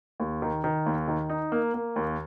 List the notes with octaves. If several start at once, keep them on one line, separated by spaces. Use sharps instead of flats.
D#2
D#3
D#3
D#2
D#3
D#4
A#3
A#3
D#2